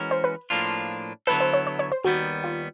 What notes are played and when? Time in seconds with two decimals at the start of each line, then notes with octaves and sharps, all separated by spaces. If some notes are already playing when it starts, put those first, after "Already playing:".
Already playing: E3 G#3 C#4 F#4 A#4
0.11 C5
0.24 B4
0.50 A2 F3 A#3 D4 F4
1.27 D3 F#3 B3 E4 A4 B4
1.40 C5
1.53 C#5
1.67 C#5
1.79 C#5
1.92 C5
2.05 D#2 D#3 G3 B3 F#4
2.44 F4